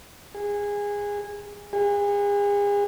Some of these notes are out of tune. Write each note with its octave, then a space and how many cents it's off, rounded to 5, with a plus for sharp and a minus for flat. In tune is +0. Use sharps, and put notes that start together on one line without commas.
G#4 -20
G#4 -40